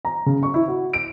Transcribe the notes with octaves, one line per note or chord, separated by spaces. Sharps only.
A#5
C#3
C#6
E4
F#4
D7